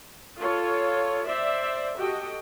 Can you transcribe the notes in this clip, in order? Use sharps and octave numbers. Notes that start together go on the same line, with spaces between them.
F4 A4 C#5
C5 D5 E5
F#4 G4 A4 D#5 G5